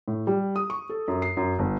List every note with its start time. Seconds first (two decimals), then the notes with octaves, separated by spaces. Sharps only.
0.08 A2
0.27 G3
0.56 D#6
0.70 C#6
0.89 A4
1.08 F#2
1.22 C7
1.37 F#2
1.59 G1